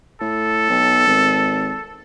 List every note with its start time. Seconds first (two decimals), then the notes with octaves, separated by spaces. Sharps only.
0.21 A2 A4
0.69 B1
1.07 G#1